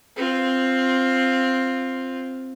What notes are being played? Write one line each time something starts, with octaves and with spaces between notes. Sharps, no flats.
C4 F4